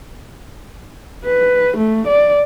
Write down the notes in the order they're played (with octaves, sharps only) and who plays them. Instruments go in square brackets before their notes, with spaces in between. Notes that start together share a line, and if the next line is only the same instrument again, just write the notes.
[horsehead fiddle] B4
A3
D5